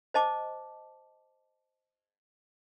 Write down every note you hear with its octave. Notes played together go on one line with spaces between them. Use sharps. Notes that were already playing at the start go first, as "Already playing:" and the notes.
C5 D#5 A5 D6